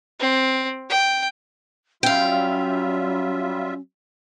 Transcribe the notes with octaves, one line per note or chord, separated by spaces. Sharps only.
C4
G5
F#3 G3 C#4 F4 E5 F5 G5